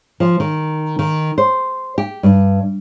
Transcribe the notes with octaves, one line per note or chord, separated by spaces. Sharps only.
F3
D#3
D#3
C5
G4
G2